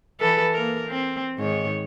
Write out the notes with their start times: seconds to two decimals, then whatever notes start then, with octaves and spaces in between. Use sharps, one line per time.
0.20 E3 A4 B4
0.53 A#3 A#4
0.88 C4
1.39 G#2 D#3 C#5